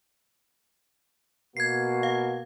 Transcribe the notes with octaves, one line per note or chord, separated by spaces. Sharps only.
B2 A#3 F#4 G#6 C7
F5